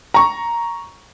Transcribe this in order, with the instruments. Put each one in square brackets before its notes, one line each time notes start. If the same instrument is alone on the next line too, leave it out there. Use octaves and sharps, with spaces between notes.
[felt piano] A#5 C#6